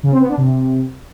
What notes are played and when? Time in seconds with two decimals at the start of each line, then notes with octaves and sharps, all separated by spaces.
0.03 C#3
0.12 C4
0.20 B3
0.29 D4
0.38 C3